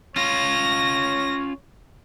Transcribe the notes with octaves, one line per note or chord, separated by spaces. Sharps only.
C#4 F4 C#5 A#6